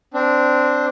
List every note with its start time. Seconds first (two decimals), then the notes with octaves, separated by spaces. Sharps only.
0.14 C4 D4